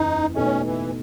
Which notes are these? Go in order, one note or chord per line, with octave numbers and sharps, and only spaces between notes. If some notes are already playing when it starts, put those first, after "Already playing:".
Already playing: F#1 E2 C#3 E3 D#4
B2 A3 C#4 D#4 A4 D#5
E3